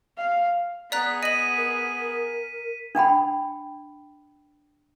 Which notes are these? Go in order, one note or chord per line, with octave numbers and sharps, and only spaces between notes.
F5
B3 G#4 D5 A#5 F#6 B6
D#5 D#7 F#7
A#4
D4 F#5 G5 B5